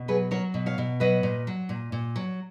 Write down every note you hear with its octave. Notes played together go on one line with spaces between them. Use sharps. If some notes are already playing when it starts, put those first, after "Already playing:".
Already playing: B2
F#3 G#4 B4
F#3 A#4 C#5
B2
C#5 F5
B2
F#3 B4 D#5
A#2
F#3
A#2
A#2
F#3